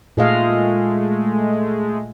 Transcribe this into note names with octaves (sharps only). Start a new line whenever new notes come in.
A#2 G#3 A3 D#5 F5